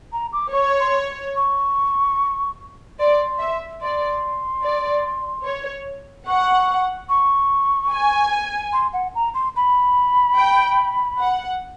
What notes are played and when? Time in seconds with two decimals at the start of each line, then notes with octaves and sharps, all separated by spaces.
0.12 A#5
0.33 D6
0.53 C#5 C#6
0.80 C6
1.36 C#6
2.99 D5 C6
3.40 E5
3.81 D5 C6
4.63 D5
5.45 C#5
6.27 F#5 C#6
7.09 C#6
7.92 G#5
8.73 C6
8.93 F#5
9.15 A#5
9.34 C6
9.56 B5
10.38 G5
11.20 F#5